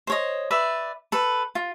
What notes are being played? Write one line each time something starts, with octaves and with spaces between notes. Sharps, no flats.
C5 C#5 D#5
B4 D5 E5
A4 B4
F4